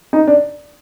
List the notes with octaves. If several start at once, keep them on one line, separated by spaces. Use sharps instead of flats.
D#4
D4